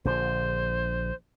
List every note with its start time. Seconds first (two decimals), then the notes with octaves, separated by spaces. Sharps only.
0.05 A#1 D3 C5